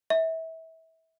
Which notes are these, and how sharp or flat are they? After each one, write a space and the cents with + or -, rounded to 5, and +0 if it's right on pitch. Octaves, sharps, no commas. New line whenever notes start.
E5 -30